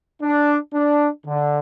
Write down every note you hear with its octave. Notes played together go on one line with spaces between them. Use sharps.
D4
D4
D3